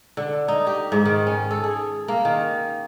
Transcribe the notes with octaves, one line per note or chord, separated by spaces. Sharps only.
D3
D#4
G4
G#2
D#3
C#4
A4
G#4
A#3
D#3